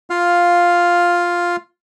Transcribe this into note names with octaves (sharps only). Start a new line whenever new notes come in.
F4 F5